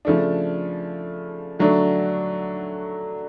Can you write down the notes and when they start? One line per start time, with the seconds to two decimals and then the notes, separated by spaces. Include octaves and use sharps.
0.05 C#3 F3 A3 D4
1.59 D3 F#3 A3 D4